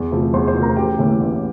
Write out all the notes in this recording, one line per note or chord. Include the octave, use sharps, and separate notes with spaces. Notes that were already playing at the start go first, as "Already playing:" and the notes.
Already playing: E2
C3 F3 A3
E2 C5 C6
C5 C6
C3 F3 A3
A#4 A#5
A1 G4 G5
A2 E3 A#3
A1